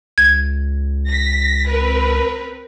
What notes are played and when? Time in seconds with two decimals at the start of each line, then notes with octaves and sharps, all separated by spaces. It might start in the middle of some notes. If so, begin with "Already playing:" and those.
0.18 C#2 G#6
1.08 A#6 B6
1.68 C4 A#4 B4